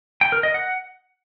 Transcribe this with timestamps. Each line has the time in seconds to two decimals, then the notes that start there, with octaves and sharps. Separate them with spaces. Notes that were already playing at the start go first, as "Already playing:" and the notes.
0.21 G5
0.32 A#4
0.43 D#5
0.54 F#5